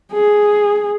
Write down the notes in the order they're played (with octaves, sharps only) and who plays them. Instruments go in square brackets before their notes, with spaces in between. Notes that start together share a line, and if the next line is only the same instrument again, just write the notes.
[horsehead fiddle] G#4